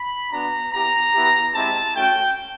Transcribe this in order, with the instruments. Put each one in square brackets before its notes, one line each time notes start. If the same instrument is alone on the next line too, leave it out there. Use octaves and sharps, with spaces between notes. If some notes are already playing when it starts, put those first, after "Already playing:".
Already playing: [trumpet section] B5
B3 D4 F#4 A#5
B3 E4 G4 A#5
B3 E4 G4
G#3 C4 E4 G4 A5
A3 C#4 F#4 G5